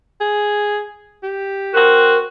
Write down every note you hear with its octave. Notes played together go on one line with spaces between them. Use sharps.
G#4
G4
C4 F#4 A#4